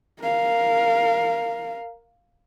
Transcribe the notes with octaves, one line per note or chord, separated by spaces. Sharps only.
A#4 F5